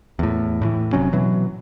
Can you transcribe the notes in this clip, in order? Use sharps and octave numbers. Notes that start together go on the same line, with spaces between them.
E2 A2
A2 E3
F1 C3 F#3 C#4
B2 E3 F#3